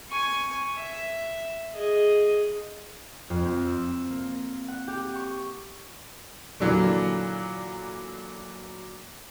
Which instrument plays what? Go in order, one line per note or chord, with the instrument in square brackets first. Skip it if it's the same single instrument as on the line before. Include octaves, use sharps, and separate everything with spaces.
[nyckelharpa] G#5 C#6
E5
G#4 D#5
[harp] F2
C4
E6
A#3
F#5
G4
C#6
[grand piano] A#2 D3 E3 F#3 A#3